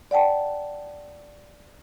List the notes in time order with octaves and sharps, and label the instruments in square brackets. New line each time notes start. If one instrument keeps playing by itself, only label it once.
[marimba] D5 F#5 G5 A5